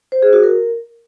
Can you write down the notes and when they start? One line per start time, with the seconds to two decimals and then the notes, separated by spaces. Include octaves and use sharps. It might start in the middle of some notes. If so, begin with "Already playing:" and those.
0.12 C5
0.23 G#4
0.33 F#4
0.43 A#4